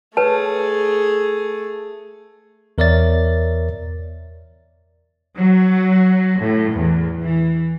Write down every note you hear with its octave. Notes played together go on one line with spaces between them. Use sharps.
A3 G#4 B4 C#5 A5
E2 A#4 C#5 D5 E5 A6
F#3
A2
E2
E3